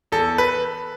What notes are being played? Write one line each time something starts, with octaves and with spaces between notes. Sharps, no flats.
E2 A4
B4